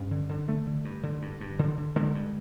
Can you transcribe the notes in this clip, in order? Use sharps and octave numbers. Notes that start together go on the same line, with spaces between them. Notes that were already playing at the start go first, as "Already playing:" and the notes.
Already playing: G2 C#4
D3
D3
D3 A3
D3
G2
D3
G2
G2
D3
D3
D3 G#3
G2